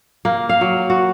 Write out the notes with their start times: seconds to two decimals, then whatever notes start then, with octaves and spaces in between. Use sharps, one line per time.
0.25 A#3
0.49 F5
0.61 F#3
0.90 F#4